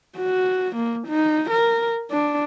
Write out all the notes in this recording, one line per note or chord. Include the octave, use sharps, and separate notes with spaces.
F#4
A#3
D#4
A#4
D4